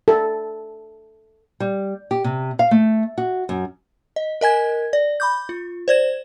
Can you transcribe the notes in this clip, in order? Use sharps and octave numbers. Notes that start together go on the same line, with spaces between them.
A4
G3
G4
C3
F5
A3
F#4
F#2
D#5
A#4 D#5 G#5 G#6
D5
B5 D6 G6
F4
C5 D5 G#6 E7